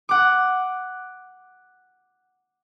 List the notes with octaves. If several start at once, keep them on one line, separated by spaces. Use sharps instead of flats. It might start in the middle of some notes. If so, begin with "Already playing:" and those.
F#5 D6